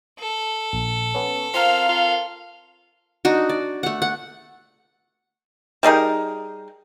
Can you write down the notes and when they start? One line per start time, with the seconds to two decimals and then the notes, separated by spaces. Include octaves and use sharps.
0.19 A4
0.73 A#1
1.15 B3 C#4
1.54 C4 F4 A#4 F5
1.89 F4
3.25 D4 D#4 F#4
3.49 D5
3.83 A3 F#5
4.02 F#5
5.83 G3 D#4 G#4 A#4